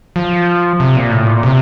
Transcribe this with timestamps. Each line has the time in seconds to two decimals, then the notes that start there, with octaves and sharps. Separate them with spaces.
0.16 F3
0.80 C3
0.96 A#2
1.11 A2
1.27 A#2
1.43 C3